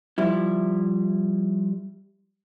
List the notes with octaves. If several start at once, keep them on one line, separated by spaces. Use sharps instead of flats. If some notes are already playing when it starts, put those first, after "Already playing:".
F3 G3 E4